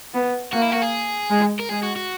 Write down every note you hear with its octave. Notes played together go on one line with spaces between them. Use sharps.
B3
A#3 F#4
E4
F#4
G#4
G#3
A#4
G#3 G#4
F#4
F#4